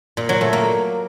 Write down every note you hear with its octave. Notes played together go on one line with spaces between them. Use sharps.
A#2
F#3
A3
A#3